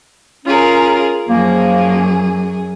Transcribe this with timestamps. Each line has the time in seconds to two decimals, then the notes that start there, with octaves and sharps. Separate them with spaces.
0.45 C#4 F4 G#4 A#4
1.28 F#2 F3 A#3 G#4